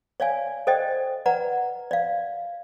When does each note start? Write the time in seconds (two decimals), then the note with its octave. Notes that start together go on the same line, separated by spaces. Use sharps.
0.20 C#5 D5 F5 G#5
0.67 A4 C5 D5 D#5 G5
1.26 B4 D5 F#5 A#5
1.91 D5 F5